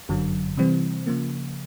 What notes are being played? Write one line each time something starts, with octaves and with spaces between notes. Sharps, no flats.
G1 F#2 D3 F#3
C3 E3 G3 C4
C#3 F3 A#3